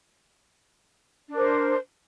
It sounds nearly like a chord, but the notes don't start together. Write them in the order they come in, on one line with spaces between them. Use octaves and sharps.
D4 A#4 C5